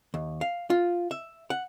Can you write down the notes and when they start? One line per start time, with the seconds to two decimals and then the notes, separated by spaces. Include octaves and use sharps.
0.14 D#2
0.41 F5
0.70 F4
1.11 E5
1.50 F#5